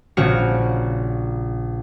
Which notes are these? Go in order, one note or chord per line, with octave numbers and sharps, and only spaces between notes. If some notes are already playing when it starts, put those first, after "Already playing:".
A#1 C#3 C#4 F#4 F6 C#7